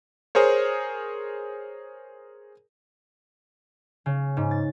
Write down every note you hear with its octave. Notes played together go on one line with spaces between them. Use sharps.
G#4 A#4 C5 C#5
C#3
G#2
A6